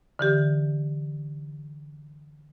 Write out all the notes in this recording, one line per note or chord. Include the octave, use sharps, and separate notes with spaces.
D3 E3 G4